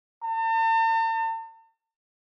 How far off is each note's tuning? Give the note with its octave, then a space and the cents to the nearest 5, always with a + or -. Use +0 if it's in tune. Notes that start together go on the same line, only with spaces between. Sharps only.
A5 +45